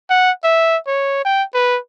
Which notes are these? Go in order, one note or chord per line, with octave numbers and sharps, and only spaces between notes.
F#5
E5
C#5
G5
B4